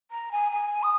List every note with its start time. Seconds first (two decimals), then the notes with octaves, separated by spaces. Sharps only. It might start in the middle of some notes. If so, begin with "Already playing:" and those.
0.11 A#5
0.32 G#5
0.52 G#5
0.83 D#6